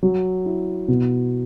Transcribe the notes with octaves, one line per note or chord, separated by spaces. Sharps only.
F#3
E4
B2